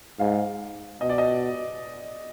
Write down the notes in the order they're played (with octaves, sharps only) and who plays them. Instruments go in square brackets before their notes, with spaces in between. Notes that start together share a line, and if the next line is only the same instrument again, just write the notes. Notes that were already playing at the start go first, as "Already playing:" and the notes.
[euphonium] G#2 [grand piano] F5
[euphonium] B2 [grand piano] D#5
[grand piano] D5
D#5